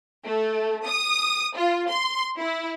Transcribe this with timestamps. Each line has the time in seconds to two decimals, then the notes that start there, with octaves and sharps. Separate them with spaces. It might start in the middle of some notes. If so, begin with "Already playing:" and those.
0.24 A3
0.86 D#6
1.56 F4
1.89 C6
2.40 E4